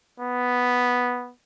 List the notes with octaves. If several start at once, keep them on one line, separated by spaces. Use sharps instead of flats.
B3